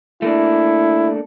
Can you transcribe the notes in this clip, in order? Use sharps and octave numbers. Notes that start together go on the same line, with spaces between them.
A3 A#3 D4 E4